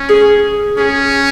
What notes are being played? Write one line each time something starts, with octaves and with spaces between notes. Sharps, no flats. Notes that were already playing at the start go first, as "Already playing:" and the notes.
Already playing: C#4
G#4
C#4 G#4